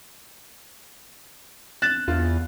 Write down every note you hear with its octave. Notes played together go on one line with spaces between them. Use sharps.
F#6 A6 E7
E2 F4